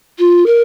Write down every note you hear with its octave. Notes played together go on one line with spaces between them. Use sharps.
F4
A#4